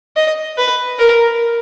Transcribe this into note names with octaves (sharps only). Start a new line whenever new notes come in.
D#5
B4
A#4